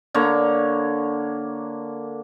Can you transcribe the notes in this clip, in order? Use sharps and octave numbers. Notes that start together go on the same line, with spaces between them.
D3 A#3 C#5 A#5